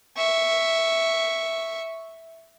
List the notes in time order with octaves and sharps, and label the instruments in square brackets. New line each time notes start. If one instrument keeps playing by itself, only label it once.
[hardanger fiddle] E5 C#6